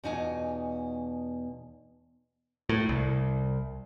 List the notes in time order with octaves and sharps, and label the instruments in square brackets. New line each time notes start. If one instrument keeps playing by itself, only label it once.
[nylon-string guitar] E2 B2 D#4 F4 G#5
[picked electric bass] A2
C2